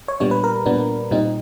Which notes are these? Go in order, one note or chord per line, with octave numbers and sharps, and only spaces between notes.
C#5
A#2 G3 B3 D4 C#5
B4
A#4
A#2 G3 B3 D4
A#2 G3 C4 D#4